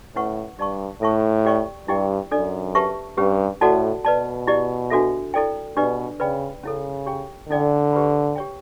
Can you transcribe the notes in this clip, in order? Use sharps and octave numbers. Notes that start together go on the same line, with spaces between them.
A2 C#4 E4 B4 F#5 C#6
G2 G4 D5 A5 C#6
A2 A4 E5 A5 C#6
G4 D5 G5 C#6
G2 E4 G4 D5 G5
F#2 D4 A4 D5
G4 B4 E5 A5 C#6
G2 C#4 G4 B4
A2 F#4 A4 D5 F#5 A5
B2 B4 D5 A5
E4 G4 D5
D4 F#4 A4 E5
E4 A4 D5 G5
B2 D4 G4 B4 D5
C#3 B4 D5 G5 B5
C#3 C#4 E4 A4
G4 C#5 G5
D3 C#4 E4 A4 D5 G5
G4 B4 F#5 B5
G4 C#5 G5